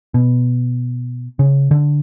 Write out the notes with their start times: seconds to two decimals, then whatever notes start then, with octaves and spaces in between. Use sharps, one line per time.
0.14 B2
1.39 C#3
1.71 D3